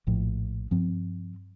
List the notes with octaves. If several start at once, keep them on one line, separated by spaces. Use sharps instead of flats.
A#1 A2 F3
G2 F3 C4